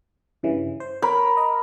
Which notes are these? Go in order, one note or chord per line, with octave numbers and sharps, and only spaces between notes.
G2 C#3 E3
C5
A#4 C#5 B5
D#5